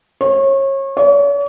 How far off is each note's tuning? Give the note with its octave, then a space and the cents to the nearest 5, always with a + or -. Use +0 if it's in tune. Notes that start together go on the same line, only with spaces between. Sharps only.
C#5 -30
C#5 +45